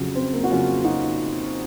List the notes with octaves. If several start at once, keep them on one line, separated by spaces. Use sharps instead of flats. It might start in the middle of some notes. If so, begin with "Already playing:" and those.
Already playing: F2 C#3 F#3
C4
A#3
F#4
F2 C#3 F#3 C#4 F4
D#4 F#4